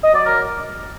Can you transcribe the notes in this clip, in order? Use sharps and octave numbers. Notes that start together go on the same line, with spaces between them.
D#5
F#3 D5
A#4